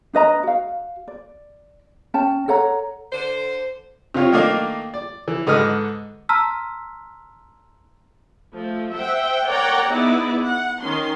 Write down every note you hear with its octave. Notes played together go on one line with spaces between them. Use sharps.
D4 B4 D#5 A#5
F#4 F5
D5
C#4 G5 A5
A4 C#5 F#5 A#5
D3 C5
C3 F3 F4 C#5
D#3 A3 A#3 D4 D#5 F5
D5
E3
G#2 D3 B4 D#5 D#6 F6
A5 A#5 C6 E6 F6 B6
F3 A3
C5 E5 F#5 G5
A#4 C#5 D5 F#5 G5 A#5
B3 D#4 E4 G#4 D5
F#5
D#3 C#4 C6